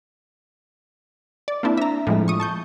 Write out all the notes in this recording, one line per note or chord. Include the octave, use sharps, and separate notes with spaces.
D5
A#3 C4 D4 E4
E5 A#5
A2 F3 G#3
C#6 D#6
A5 C#6 G6